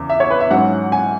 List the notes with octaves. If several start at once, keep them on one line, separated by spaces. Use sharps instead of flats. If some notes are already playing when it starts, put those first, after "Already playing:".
Already playing: E2 C#3 E3
E5
C#5
B4
E5
G#2 F#3 C#4 F#5
G#5